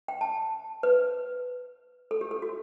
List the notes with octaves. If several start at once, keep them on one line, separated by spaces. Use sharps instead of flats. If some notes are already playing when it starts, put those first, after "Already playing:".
G5
A5
B4
A4
G4
A4
F#4